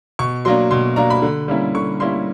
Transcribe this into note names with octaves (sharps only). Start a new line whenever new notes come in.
B2 C#6
F#3 A#3 D4 C6
B2 C6
F#3 A#3 D4 A#5
B5
D3
G3 A#3 C#4 E4
D3 C#6
G3 A#3 C#4 E4 C6